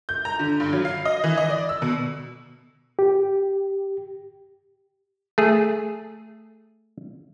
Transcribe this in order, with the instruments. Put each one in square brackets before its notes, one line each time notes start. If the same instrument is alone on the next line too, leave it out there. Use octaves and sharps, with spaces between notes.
[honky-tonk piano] G6
A#5
D3
G2
F#3
F5
D#5
E3
D#5
D5
E6
B2
[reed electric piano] G4
[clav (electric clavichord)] A3 G#4